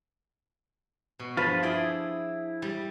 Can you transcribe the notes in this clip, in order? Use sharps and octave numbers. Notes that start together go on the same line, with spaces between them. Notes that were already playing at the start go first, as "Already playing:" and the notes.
B2
G2 F3 F4 B4
E4 G#4 D5 G5
G3